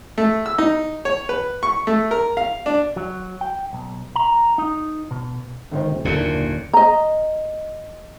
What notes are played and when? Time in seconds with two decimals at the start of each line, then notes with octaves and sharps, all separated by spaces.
0.18 A3
0.46 E6
0.58 D#4
1.05 C#5
1.29 B4
1.63 C#6
1.87 A3
2.11 A#4
2.37 F5
2.66 D4
2.96 F#3
3.41 G5
3.73 B1
4.16 A#5
4.58 D#4
5.11 B2
5.72 G#1 D#3 C5
5.91 D#1
6.05 F#1 D#2 A#2 D3 C#7
6.73 D#5 A#5